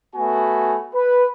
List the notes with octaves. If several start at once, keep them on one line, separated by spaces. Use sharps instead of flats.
A3 B3 F#4 G#5
B4